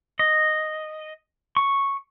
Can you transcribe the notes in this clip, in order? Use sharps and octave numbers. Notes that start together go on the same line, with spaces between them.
D#5
C#6